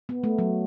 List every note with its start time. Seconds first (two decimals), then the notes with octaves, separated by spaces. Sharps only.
0.09 B3
0.24 A3
0.39 F#3